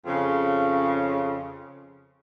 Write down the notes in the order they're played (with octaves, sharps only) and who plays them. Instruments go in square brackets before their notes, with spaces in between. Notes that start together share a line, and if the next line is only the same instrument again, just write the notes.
[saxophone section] F2 C#3